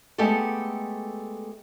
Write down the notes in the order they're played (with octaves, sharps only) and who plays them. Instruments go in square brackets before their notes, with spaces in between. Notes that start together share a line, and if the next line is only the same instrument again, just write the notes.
[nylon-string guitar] G#3 A3 B3 G4 A4